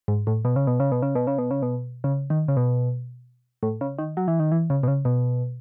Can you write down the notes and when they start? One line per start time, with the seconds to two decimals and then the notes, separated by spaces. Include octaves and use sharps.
0.08 G#2
0.27 A2
0.45 B2
0.56 C#3
0.67 B2
0.80 C#3
0.92 B2
1.02 C#3
1.15 B2
1.27 C#3
1.38 B2
1.51 C#3
1.62 B2
2.04 C#3
2.30 D#3
2.48 C#3
2.57 B2
3.63 A2
3.81 C#3
3.98 D#3
4.17 F#3
4.28 E3
4.40 D#3
4.52 E3
4.70 C#3
4.83 B2
4.88 C#3
5.05 B2